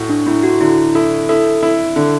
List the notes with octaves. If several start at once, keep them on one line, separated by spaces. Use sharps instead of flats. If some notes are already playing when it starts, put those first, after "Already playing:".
Already playing: A2 F#4
D4
A2 E4
F#4
D3 E4
E4 A4
E4 A4
E4
D3